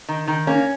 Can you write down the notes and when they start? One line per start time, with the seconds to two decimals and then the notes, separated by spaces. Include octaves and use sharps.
0.09 D#3
0.28 D#3
0.47 A#3 C#4